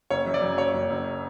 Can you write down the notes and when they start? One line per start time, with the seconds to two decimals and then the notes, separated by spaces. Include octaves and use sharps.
0.10 F#1 C#5
0.26 F#2
0.34 D5
0.42 F#2
0.58 F#1 C#5
0.74 F#1
0.90 F#1